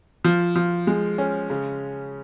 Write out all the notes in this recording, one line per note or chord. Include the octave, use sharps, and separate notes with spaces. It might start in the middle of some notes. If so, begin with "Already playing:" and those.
F3
F3
G#3
C#4
C#3